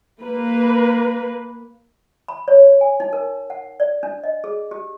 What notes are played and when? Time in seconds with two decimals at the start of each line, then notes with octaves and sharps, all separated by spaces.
0.23 A#3 B4
2.28 B5
2.48 C#5
2.81 G#5
3.00 D#4
3.13 A#4
3.50 F#5
3.80 D5
4.03 D4
4.24 D#5
4.44 G#4
4.71 G4